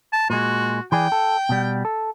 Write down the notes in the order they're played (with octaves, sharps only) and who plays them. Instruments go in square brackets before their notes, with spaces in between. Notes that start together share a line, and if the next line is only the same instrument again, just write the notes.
[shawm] A5
[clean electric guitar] A#2 G#3 [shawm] F#4
[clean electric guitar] E3 G#4 D5 [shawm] G5
[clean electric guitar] A4
B2 G3
A4